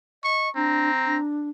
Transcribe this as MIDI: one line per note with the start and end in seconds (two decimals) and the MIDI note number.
0.24 0.50 75
0.24 0.50 85
0.56 1.18 60
0.56 0.90 62
0.56 1.20 82
1.06 1.49 62